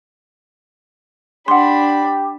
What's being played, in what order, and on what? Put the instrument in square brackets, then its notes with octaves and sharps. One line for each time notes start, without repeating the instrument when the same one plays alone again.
[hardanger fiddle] D4 B5 [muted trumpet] G4 [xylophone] F#5 C6